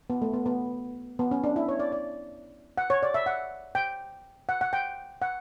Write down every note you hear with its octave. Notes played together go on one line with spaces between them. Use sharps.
B3
A3
B3
B3
B3
C#4
D4
E4
C#5
D5
D5
F#5
C#5
D5
E5
F#5
G5
F#5
F#5
G5
F#5